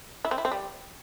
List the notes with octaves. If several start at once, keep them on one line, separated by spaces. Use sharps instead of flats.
E4
C4
E4
C4
G3